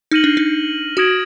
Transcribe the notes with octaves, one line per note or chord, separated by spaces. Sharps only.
D#4 F6 A#6 D#7 F#7
D4
D#4
F#4 D#6 G#6 D7 F#7